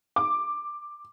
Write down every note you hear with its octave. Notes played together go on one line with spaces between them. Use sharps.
D6